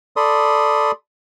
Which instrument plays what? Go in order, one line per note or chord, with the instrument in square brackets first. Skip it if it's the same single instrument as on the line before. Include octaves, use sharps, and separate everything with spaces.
[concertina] A4 D5 B5 C6 D#6